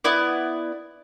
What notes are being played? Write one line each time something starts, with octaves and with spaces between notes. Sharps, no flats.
B3 E4 D5